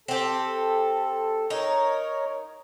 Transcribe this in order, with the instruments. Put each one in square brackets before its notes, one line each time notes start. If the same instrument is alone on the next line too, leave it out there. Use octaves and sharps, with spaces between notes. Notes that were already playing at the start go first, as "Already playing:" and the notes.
[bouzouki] C4 G4 [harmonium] A4
[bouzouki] D#4 [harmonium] A#4 C#5